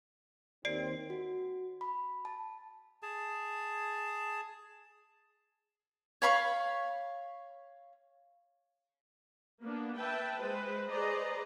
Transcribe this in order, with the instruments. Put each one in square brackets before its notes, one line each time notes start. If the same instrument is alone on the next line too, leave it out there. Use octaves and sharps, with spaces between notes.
[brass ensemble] D#2 C4 [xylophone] D5 C7 D7
[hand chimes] F#4
B5
A5
[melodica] G#4 A5
[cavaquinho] C#5 F5 B5 C#6
[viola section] A#3 B3 D4
B4 E5 G5 A5
G#3 B4 C5
G#4 B4 C5 D5 D#5 A#5